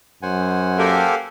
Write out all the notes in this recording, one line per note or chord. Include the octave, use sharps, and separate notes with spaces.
F#2 C5 F#5 G#5
A#3 G4 A4